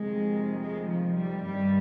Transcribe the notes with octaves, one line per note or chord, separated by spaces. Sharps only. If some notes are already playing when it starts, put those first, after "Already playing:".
Already playing: F2 C3 D#3 G#3
G#3
F3
G3
G2 D#3 G3